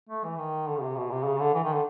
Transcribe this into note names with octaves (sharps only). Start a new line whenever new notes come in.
A3
E3
D#3
D3
C#3
C3
B2
C3
C#3
D3
E3
D#3
D3